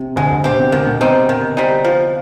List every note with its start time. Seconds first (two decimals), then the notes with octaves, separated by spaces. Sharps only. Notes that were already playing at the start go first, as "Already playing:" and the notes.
Already playing: C3
0.16 D2 D3 G#3
0.30 D2 D3
0.44 B2 C4 G4
0.58 C3
0.72 D2 D3 D#3
0.87 B2
1.00 C3 G3 C4 D#4
1.28 C3 D#3
1.57 G3 C4 D#4
1.85 F3